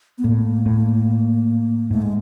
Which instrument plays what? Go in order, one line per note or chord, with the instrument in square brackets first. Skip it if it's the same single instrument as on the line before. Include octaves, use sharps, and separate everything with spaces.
[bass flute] B3
[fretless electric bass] A2 [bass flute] A#3
[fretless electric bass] A2
[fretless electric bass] G#2 [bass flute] A3
[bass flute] G#3